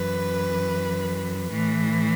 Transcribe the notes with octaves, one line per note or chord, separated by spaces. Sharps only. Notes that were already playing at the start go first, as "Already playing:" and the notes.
Already playing: F#2 E3 B4
A2 E3